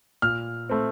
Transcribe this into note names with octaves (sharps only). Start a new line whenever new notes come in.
A#2 F6
A3 C4